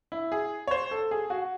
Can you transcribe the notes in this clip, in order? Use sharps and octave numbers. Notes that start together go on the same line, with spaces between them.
E4
G#4
C#5
C5
A4
G#4
F#4